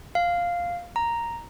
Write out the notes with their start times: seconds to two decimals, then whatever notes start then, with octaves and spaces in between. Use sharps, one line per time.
0.15 F5
0.96 A#5